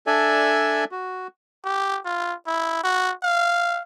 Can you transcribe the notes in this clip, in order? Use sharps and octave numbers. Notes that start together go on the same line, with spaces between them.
D4 A4 D5 E5 G#5
F#4
G4
F4
E4
F#4
F5